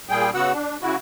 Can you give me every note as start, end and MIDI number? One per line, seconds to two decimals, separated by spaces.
0.09 0.30 46
0.09 0.30 55
0.09 0.30 68
0.09 0.30 79
0.34 0.52 49
0.34 0.52 59
0.34 0.52 66
0.34 0.52 78
0.34 0.52 88
0.53 0.76 62
0.82 0.96 49
0.82 0.96 64
0.82 0.96 66